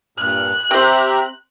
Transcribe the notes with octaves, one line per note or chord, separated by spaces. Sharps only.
G2 A#2 F6 F#6
C4 G4 C5 E5 A#5